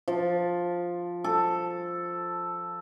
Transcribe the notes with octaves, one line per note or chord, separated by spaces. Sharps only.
F3
A4